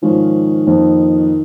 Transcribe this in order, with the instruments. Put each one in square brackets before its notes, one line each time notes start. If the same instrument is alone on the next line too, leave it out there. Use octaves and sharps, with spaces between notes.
[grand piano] G#2 F3 C#4 F4 [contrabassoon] D#3
[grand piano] F2 F3 A#3 D#4